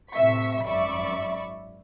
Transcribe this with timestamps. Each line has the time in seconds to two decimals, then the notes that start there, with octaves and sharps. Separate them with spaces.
0.13 A2 C3 E5 C#6 B6
0.64 G#1 F#2 D5 E5 B5 C#6